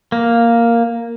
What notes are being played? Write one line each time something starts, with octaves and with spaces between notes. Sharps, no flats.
A#3